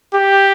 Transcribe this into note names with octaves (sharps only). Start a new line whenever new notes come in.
G4